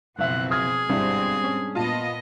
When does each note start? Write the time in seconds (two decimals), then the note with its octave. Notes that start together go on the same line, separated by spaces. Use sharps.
0.19 F#1 B2 F3 C4 E5 F#5
0.51 G#4 D#6 F6 G#6
0.90 G1 G#2 B2 G3 C4 D4 E4
1.44 C#4
1.75 A#2 B3 F4 D#5 A5